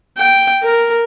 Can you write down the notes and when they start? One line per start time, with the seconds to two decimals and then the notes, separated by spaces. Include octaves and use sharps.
0.17 G5
0.63 A#4